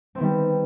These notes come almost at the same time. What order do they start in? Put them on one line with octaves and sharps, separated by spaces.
C4 B3 D#3 G3